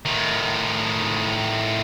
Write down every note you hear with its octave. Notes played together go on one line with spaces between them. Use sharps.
A2 D#3